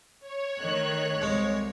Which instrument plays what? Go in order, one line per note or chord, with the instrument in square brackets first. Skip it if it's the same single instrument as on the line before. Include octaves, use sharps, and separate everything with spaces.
[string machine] C#5
[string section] D#3 A3 F#6
[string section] C2 [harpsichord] G#3